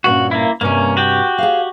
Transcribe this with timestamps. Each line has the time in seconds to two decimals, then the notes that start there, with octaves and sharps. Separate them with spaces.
0.04 G2 A#2 C#4 F#4
0.31 A#3 E4
0.61 G2 C3 A#3 C#4
0.97 F#4 G4 G5
1.38 G#4 C5 F5